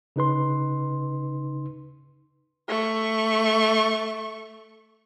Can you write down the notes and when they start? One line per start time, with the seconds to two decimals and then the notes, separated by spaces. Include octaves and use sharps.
0.16 C#3 D#4 B4 C6
2.68 A3 C#6